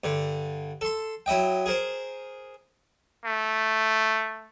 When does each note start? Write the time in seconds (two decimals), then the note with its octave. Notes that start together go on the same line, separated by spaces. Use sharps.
0.04 G2 D3
0.81 A4 C6
1.26 F#3 E4 D#5 G5
1.66 G#4 A#4 C5
3.25 A3